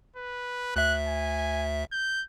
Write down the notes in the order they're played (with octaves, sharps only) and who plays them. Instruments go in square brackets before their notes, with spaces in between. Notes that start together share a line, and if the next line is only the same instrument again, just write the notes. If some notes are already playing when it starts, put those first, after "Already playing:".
[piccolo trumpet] B4
[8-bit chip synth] D2 E5 [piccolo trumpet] F#6
[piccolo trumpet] G#5
G6